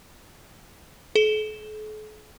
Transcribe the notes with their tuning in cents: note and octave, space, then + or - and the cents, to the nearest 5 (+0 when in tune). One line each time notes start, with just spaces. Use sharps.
A4 -45